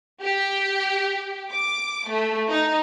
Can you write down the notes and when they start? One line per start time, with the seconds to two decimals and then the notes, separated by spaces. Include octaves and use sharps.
0.22 G4
1.53 D6
2.09 A3
2.50 D#4